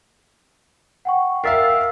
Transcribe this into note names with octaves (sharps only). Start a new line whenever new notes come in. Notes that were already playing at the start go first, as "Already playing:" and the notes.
F#5 G5 C#6
A#4 E5 F5 E6 A6 C7